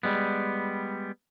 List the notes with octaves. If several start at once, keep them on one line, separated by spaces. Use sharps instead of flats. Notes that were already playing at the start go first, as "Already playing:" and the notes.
G3 G#3 B3